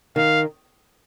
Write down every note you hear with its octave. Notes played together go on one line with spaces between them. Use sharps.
D#3 F5